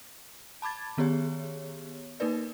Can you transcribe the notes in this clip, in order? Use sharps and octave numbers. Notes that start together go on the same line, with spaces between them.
A5 B5 D6 G#6 A6
D#3 B3 G4 G#4 C#5
A#3 D#4 A#4 B4 D5